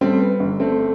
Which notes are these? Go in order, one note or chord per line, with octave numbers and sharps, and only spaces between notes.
G3 A3 C4
B3
G1
A3 C4
A3